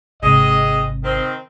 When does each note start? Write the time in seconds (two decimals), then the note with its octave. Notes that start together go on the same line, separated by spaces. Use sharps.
0.22 G#1 C3 G#3 C4 D#5
1.04 D#3 C4